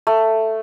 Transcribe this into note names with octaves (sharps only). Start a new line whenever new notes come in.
A3